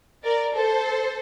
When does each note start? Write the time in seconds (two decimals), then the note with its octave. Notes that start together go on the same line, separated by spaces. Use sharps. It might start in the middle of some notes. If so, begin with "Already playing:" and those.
0.24 A#4 D5
0.55 A4 C5